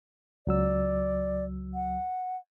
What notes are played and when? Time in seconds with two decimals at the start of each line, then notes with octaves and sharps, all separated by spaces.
0.47 C#2 F#3 D5 E6
1.74 F#5